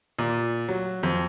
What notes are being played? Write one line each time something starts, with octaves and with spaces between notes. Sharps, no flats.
A#2
F#3
F2